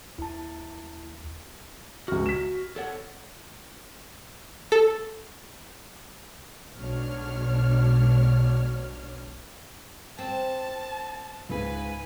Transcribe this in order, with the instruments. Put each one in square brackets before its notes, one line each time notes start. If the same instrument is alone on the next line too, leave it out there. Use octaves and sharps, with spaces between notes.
[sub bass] D#2 [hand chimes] E4 A5
[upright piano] C#2 F6 [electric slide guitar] F#4
[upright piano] B6 E7
[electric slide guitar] A4 C#5 F#5
[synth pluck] A4
[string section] B1 G#2 B2 D4 C#5 F6
[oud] C4 [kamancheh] A5
[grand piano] C#2 G#2 [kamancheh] B4 G#5